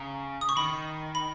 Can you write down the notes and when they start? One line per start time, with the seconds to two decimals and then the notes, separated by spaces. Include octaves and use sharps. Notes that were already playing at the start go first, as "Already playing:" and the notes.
Already playing: C#3 A#5
0.41 D#6
0.49 C#6
0.57 D#3 B5
1.15 B5